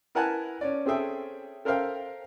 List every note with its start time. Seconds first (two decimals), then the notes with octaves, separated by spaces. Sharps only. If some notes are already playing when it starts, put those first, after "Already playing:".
0.15 E4 A#4 B4 F#5 G#5 A5
0.61 C#4 C#5 D5
0.85 C4 C#4 G#4 A4 E5 G5
1.65 A4 A#4 C5 E5 F5 G5